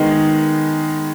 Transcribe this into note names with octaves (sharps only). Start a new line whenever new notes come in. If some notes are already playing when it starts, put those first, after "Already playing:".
Already playing: D#3 G#3 B3 D#4